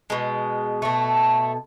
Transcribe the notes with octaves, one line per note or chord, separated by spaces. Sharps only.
B2 G#3
B2 A3